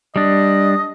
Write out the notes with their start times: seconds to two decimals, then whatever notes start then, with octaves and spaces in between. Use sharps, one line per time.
0.16 G3 D4 D#5